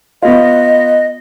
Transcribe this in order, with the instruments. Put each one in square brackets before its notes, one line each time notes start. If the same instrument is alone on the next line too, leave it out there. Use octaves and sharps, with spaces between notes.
[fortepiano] B3 F4 [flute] D#5